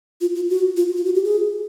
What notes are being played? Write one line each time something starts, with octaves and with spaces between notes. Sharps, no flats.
F4
F4
F#4
F4
F4
F#4
G4
G#4